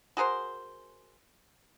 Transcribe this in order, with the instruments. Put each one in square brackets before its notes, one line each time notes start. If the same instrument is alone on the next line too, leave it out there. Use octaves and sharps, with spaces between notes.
[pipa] F#4 G#4 A#4 C5